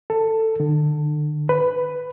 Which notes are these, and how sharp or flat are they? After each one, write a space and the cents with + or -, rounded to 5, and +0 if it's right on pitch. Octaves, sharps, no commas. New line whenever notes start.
A4 +15
D3 +40
B4 +10